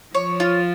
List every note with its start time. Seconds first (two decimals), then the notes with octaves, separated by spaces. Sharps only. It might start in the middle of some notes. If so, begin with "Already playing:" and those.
0.15 F3 C#5
0.40 F4